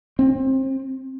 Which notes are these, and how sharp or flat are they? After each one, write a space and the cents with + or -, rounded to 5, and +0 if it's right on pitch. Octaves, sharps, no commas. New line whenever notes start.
C4 +30